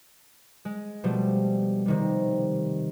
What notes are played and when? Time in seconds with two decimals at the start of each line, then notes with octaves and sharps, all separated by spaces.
0.65 G#3
1.04 B2 F3 G3 A3
1.86 C3 D#3 G3